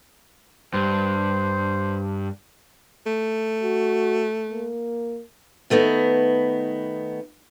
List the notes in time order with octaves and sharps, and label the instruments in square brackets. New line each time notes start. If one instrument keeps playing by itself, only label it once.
[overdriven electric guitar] G2 [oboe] C5
[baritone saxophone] A3
[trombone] F#4
A#3
[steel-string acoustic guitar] D#3 A3 B3 D#4